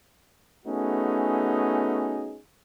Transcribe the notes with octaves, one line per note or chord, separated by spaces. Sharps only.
A3 B3 C#4 D#4 F#4 G#4